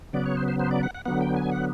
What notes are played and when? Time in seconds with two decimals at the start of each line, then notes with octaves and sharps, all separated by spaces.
0.13 C#3 F#3 B3 D5
0.26 C#5
0.37 C5
0.48 C5
0.60 C5
0.71 D5
0.83 F#5
0.95 F#5
1.05 D3 F#3 B3 F#5
1.21 G5
1.36 G#5
1.52 F#5